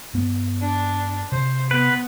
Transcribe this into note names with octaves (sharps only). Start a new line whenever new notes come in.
G2 B3
D4
C3 C5
B3 B4